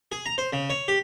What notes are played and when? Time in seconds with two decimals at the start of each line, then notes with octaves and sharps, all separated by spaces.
0.12 G#4
0.26 A#5
0.38 C5
0.53 C#3
0.70 C#5
0.88 G4